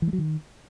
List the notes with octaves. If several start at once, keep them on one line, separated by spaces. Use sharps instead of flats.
E3
G#3
F#3
D#3